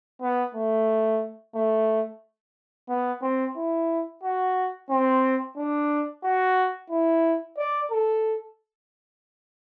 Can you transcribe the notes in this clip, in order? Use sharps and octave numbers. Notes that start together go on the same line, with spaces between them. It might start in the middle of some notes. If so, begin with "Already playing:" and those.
B3
A3
A3
B3
C4
E4
F#4
C4
D4
F#4
E4
D5
A4